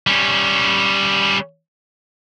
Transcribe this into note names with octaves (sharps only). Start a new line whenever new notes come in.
G3 C#4